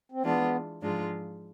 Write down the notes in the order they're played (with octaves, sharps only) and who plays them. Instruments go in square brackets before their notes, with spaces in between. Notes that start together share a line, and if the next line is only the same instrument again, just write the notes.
[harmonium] C4
[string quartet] E3 G#3 D4 F4 [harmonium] B3
[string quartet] G#2 F3 G#3 D4 F4